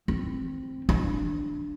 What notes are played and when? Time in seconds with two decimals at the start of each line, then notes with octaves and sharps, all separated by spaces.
0.08 C4
0.89 D4